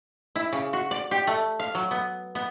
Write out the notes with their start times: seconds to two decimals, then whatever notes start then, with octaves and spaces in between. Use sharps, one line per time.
0.36 E4
0.53 C#3
0.73 F#4
0.91 D5
1.11 G4
1.27 A3
1.60 F5
1.75 F#3
1.91 B3
2.35 B3